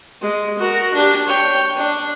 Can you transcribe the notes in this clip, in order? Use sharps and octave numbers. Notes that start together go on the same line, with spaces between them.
G#3
F#4 A#4
D4 G4
C#5 G5
D4